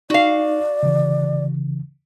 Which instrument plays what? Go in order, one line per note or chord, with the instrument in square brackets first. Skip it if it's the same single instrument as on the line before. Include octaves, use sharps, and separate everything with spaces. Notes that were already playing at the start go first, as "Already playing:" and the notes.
[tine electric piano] D#4 [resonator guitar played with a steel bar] F#4 F5 [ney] D5
[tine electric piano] C#3 E3